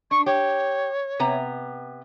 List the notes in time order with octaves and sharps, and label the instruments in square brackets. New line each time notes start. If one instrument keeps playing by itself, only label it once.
[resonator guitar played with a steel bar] D4 [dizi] C#6
[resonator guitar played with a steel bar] G4 [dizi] C#5
[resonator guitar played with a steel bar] C3 B3 A#5